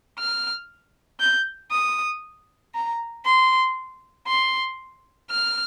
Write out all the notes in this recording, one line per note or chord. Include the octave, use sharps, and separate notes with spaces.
F6
G6
D#6
A#5
C6
C6
F6